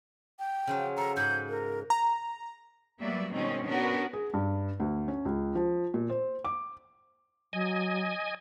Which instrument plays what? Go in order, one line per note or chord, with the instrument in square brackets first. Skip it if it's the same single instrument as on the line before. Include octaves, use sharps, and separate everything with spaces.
[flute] G5
[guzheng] C#3 F3 F#3
[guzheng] A4 [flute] A#5
[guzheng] G#2 B5 [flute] G6
[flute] A#4
[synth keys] A#5
[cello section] F#3 G3 A#3 B3 D5 E5
B2 D#3 G3 G#3 C4 C#4
B3 C#4 D4 F#4 A#4 B4
[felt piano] G#4
G2
D2
C#4
C#2
F3
A#2
C5
D6
[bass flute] F#3 [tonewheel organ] D#5 G#5